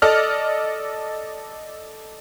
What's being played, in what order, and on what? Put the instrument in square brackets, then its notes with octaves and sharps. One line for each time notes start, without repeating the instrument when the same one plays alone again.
[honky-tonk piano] A4 D5 D#5 F6